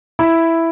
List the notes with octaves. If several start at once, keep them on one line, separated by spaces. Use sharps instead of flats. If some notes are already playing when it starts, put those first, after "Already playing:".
E4